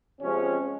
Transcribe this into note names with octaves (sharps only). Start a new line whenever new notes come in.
C3 F3 G#3 C4 C#4